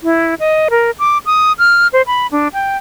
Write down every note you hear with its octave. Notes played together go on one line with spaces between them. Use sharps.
E4
D#5
A#4
D6
D#6
F6
C5
B5
D4
G5